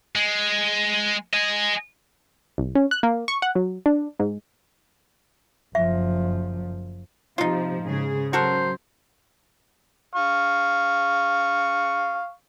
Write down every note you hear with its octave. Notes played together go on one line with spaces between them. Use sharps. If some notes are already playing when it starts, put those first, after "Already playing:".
G#3
D#5 G#5
C2
C#4
F#6
A#3
C#6
F#5
F#3
D4
G#2
F#1 F3 E5
C3 F3 D#4 F4
G#2 C#3 G#4
C#3 F#3 F#4 A4 A#4 C5
F5 C#6